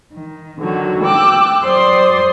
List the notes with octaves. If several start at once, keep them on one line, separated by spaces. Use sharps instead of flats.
D#3
D3 D#3 F#3 F#4
G5 D6 E6 F#6
F#3 C5 D5 C6 D#6